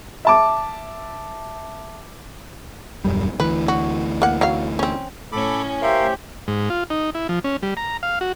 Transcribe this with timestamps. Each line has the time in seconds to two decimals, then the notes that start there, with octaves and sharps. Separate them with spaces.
0.25 E5 A5 D6
3.05 D#1 F#2 G3
3.40 D2 E3 B4
3.68 F#4
4.22 A#3 F#5
4.41 F#3 F5
4.79 C4 C#4
5.32 A2 C#4 A4 B5 D6
5.82 G4 A#4 C5 E5 F5
6.48 G#2
6.70 F4
6.90 D#4
7.15 E4
7.29 F3
7.44 C#4
7.63 G3
7.77 A#5
8.03 F5
8.21 F#4